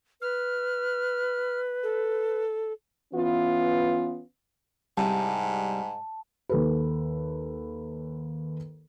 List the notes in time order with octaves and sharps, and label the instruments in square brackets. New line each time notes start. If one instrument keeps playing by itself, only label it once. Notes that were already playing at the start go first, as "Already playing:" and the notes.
[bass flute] B4 [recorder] F6
[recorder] A4
[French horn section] E3 B3 C#4 F4
[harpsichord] C2 [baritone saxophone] G#2 [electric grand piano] G3 [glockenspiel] A5
[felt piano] D#2 A4 B4